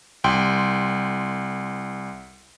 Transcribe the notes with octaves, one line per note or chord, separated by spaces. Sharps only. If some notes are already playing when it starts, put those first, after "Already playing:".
C2 G5 C6